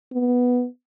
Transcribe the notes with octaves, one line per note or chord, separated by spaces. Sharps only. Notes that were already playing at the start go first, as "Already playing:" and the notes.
B3